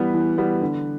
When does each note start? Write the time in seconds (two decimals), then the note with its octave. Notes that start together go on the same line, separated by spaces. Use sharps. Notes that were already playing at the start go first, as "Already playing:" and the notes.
Already playing: E3 G3 B3 B4
0.14 E3
0.38 G3 B3
0.61 D3